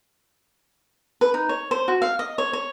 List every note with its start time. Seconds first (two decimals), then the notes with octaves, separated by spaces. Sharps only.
1.21 B4
1.34 D#4
1.49 C#5
1.71 C5
1.88 F#4
2.02 F5
2.19 D#5
2.38 C#5
2.53 C#5